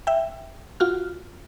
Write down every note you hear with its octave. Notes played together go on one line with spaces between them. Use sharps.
E5 G5
F4 F#4 F6